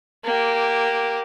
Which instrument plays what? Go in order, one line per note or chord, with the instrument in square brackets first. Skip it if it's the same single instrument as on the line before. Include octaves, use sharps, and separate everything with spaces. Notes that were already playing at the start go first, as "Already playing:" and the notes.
[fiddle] A#3 G4